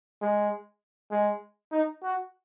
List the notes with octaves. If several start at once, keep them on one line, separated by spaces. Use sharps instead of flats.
G#3
G#3
D#4
F#4